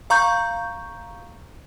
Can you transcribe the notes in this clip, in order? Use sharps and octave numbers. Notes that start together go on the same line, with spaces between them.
F5 A#5 C#6 G6